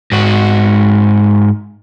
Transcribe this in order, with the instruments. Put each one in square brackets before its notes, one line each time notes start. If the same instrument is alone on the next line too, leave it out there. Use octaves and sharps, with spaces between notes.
[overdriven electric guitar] G#2 F#4